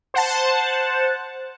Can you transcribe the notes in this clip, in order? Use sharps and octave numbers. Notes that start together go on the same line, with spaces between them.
C5 F#5 A5